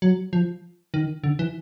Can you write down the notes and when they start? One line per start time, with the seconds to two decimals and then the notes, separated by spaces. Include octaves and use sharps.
0.02 F#3
0.33 F3
0.94 D#3
1.24 D3
1.39 E3